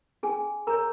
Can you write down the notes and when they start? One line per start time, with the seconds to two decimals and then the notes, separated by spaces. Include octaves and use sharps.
0.23 C#4 G#4 G#5
0.67 G#4 A#4 C#5 A#5